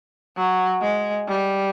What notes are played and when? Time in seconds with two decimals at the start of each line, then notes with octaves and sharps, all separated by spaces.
0.37 F#3
0.81 G#3
1.27 G3